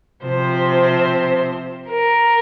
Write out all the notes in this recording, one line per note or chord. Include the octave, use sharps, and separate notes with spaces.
C3 F3 C4 C5
A#4